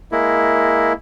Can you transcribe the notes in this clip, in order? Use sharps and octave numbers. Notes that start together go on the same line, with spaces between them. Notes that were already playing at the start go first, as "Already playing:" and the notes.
G#3 A#3 E4